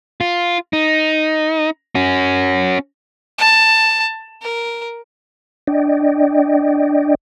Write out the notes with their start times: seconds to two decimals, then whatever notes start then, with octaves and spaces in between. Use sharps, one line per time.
0.21 F4
0.73 D#4
1.95 C#4 F#4
3.38 A5
4.42 A#4
5.67 D4 D5 D#5 G5